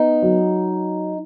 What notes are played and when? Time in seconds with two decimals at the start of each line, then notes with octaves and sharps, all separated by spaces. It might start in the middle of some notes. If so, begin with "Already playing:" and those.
Already playing: B3 D#4
0.22 F#3